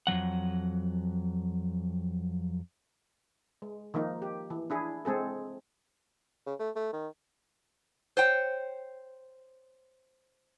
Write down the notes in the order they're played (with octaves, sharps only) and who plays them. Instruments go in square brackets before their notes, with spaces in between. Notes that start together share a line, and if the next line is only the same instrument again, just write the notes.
[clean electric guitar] F2 F3 F#3 F#5
[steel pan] G#3
D#3 F3 A#3 D#4
G4
E3
D4 E4 G#4
G#3 C4 G#4 A4
[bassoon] C#3
A3
A3
D#3
[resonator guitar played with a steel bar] C5 C#5 G5